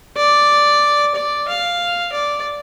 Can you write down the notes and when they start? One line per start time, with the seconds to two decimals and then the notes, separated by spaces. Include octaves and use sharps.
0.17 D5
1.15 D5
1.48 F5
2.13 D5